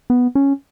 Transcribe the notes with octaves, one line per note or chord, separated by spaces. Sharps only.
B3
C#4